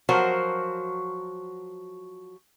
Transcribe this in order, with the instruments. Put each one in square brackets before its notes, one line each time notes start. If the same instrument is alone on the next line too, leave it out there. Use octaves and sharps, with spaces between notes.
[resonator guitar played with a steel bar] F3 F#3 F#4 A#4 C5